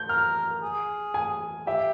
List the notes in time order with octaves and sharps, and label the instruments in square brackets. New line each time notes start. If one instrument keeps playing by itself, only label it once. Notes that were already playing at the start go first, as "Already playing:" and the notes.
Already playing: [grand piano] G6
[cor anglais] A#4 [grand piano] F6
[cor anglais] G#4
[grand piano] G#5
[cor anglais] G4 [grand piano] E5